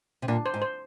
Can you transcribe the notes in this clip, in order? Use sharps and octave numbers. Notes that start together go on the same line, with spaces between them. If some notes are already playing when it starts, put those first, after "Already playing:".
C3
A#2 D4
C5
G#2
C5